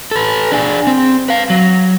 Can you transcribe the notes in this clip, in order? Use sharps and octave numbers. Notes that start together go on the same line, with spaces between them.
A4 B4
D4 G#4
C4
B4 F5
F#3